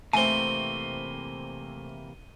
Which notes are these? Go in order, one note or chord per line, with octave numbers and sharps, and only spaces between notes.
C3 E3 A3 A#3 C4 G#5 D#7 G7